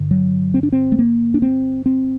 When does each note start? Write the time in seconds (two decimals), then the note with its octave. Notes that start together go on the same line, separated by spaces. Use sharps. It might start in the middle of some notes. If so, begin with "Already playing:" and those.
Already playing: G2 D3
0.11 F#3
0.54 C4
0.63 D4
0.72 C4
0.92 A3
0.99 A#3
1.34 D4
1.42 C4
1.86 C4